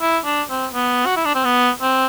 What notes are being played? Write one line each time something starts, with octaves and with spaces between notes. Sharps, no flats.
E4
D4
C4
B3
F#4
E4
D4
C4
B3
C4